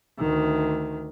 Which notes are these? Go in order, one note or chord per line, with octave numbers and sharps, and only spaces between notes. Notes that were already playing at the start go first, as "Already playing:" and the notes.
D2 D#3